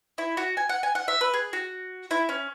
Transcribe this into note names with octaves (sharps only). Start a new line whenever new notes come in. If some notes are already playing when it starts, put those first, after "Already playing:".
E4
F#4
G#5
F#5
G#5
F#5
E5
B4
G#4
F#4
E4
C#4